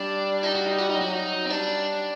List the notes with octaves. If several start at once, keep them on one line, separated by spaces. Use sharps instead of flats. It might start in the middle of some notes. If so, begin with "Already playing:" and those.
Already playing: G3 D4
D#4
F#4
D#4
F#4
D#4
F#3 F#4
D#4
C4
G3 D4